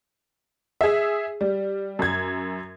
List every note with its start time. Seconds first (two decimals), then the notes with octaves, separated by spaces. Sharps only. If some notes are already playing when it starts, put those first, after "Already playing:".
0.81 G#4 E5
1.41 G3
1.99 F#2 G#6